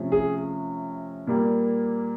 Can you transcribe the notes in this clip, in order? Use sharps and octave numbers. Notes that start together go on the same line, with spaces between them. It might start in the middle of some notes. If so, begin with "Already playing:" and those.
Already playing: C3 F3 A3 C#4
G#4
A#2 G3 A#3